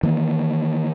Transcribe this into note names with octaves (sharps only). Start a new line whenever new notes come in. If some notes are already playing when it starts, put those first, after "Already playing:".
D#3 E3 A#3